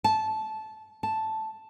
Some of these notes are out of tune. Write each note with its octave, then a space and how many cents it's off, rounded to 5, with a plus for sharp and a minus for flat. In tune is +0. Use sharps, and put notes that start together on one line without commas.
A5 -15
A5 +0